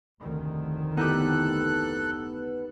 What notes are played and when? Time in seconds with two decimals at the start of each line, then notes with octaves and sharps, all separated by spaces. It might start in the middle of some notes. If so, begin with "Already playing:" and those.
0.21 F1 D2 D#3
0.97 B3 D#4 E4 G4 A4 F#6